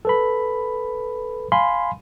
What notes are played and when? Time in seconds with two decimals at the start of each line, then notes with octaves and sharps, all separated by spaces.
0.05 A4 B4 B5
1.52 F5 G#5 B5 C6